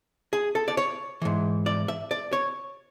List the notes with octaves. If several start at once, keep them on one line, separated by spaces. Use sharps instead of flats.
G#4
A4
D5
C#5
G#2 E3
D5
E5
D5
C#5